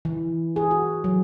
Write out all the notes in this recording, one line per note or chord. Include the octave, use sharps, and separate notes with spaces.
E3
G#4
F#4
F#3